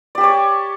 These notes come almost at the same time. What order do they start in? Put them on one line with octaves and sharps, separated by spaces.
D5 G4 A5 C#5